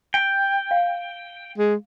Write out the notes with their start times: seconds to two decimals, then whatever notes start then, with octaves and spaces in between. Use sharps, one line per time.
0.14 G5
0.71 F5
1.58 G#3